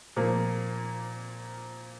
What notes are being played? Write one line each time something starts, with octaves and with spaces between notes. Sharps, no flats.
A#2 F3 A#3